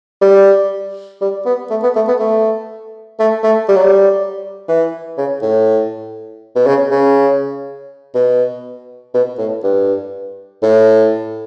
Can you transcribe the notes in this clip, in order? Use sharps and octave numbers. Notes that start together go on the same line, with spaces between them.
G3
G3
B3
A3
B3
A3
B3
A3
A3
A3
G3
F#3
G3
E3
C#3
A2
B2
C#3
C#3
B2
B2
A2
G2
A2